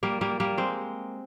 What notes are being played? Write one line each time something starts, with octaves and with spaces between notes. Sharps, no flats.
G3 A#3
G3 A#3
G3 A#3
G#3 C4